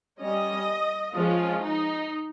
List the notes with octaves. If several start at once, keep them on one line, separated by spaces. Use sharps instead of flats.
G3 C#4 D#5
F3 G#3 C#4 F4
D#4